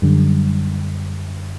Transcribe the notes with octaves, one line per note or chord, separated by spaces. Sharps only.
F#2 D3 G3